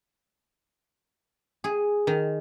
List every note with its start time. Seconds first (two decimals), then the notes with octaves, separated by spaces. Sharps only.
1.64 G#4
2.07 D#3